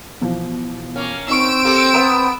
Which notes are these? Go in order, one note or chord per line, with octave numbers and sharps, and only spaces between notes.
B2 E3 F3
A#3 C#4
C4 D#4 C#6 E6 D7
A#3 G4 A4
B3 B4 A#5